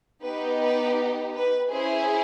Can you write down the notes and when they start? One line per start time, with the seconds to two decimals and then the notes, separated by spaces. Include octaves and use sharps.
0.24 B3 D#4 G4 B4
0.60 B4
1.34 B4
1.71 C#4 E4 G#4 C5